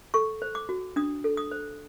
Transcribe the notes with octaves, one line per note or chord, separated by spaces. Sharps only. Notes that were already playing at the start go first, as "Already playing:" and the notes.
A4 C#6
C5
D6
F#4
D4 D#6
A4
D#6
C5